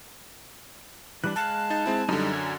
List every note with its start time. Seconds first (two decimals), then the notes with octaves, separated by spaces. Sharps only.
1.24 E3 G3 D4 F#6
1.36 G#3 F5 A5
1.70 D#4 A6
1.86 G#3 C4 E4
2.09 F#2 D3 G3 D#4
2.33 G#5